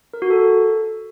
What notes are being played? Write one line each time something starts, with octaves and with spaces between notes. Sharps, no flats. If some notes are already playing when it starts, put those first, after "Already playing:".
A#4
F#4
A4